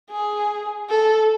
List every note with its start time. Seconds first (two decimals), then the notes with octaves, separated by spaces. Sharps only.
0.11 G#4
0.89 A4